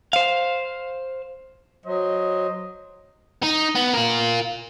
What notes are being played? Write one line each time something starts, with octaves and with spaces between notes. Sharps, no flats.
C5 F5
F#3 C5 D#5
D#4
B3
F4 A#4